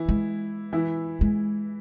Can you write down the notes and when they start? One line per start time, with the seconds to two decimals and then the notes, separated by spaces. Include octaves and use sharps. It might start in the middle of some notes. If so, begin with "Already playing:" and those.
Already playing: E3 E4
0.09 G#3
0.73 E3 E4
1.21 G#3